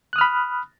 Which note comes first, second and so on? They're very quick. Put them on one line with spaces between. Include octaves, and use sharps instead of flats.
F#6 D#6 F6 B5